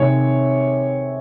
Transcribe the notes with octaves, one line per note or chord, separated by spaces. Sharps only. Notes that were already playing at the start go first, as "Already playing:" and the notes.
Already playing: C3 D#3 G#3 C4 C#5